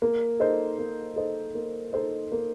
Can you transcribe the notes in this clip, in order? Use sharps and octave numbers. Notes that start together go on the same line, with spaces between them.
A#3
D#4 A4 C5 D#5
A#3
D#4 A4 C5 D#5
A#3
D#4 A4 C5 D#5
A#3